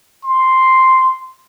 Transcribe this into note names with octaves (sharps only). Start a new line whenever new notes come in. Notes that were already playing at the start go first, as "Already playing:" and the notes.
C6